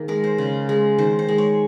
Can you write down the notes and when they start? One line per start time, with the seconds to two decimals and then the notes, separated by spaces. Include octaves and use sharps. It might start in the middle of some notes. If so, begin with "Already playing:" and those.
Already playing: D#3 A#3 G#4
0.08 G#3 A#4
0.24 C5
0.38 C#3
0.69 G#3
0.98 D#3 C5
1.19 C5
1.28 G#3
1.38 C#5